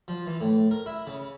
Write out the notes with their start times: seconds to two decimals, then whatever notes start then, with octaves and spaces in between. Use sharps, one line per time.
0.08 F3
0.27 E3
0.41 A2
0.71 A#4
0.86 E4
1.07 C#3